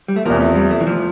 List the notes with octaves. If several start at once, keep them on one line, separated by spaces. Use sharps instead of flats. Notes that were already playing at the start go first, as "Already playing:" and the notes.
G3
A3
E2 C3 F3 A#3
A3
G3
A3
E3
F3